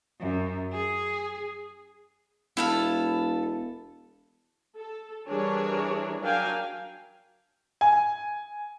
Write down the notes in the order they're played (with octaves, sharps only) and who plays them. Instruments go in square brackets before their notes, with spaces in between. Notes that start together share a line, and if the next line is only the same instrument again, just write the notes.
[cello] F#2
G#4
[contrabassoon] E1 [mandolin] E4 F4 A4
[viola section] A4
E3 G3 D4 G#4 A#4 C#5
F#3 D4 A#4 F5 G5 G#5
[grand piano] G#5